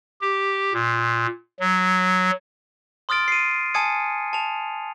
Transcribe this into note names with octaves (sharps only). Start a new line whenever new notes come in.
G4
A#2
F#3
C6 D#6 F6 A6 D7
C7 D#7
G#5 A5 D#6 G#6 C#7 D#7
A5 F7